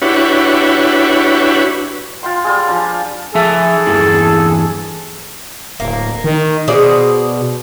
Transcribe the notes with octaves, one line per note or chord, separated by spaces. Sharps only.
D4 E4 F#4 G4 B4 C#5
F4 G5 C6
G3 F4 G#4
F3 D4 G#5
F3 G#4 A4 E5
E2 G2 E3
D1 A#3
D#3
B2 G#4 C5 D5